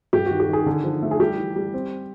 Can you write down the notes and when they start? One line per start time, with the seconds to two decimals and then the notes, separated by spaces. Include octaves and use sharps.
0.13 G2 G4
0.26 D#3 F#4
0.40 G4
0.49 D#3 G#4
0.66 D3
0.84 F3
1.02 A3
1.11 G#4
1.20 G3 G4
1.37 E3
1.56 G3
1.74 C4